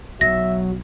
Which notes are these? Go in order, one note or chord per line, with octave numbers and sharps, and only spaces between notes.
B1 F#3 E5 A#6